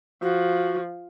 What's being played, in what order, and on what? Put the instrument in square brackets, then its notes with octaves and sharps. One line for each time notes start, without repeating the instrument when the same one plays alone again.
[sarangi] F3 [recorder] F#4